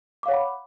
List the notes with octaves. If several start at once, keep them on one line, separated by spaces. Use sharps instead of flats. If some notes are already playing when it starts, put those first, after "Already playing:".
C#5 F5 F#5 B5 D6